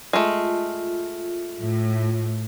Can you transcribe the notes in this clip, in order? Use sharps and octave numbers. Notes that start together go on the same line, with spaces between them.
G#3 A3 F4
A2